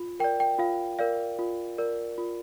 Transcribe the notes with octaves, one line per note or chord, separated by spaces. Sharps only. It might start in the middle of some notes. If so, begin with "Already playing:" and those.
Already playing: F4
A#4 D5 G5
G5
F4 F5
A#4 D5 F5
F4
A#4 D5
F4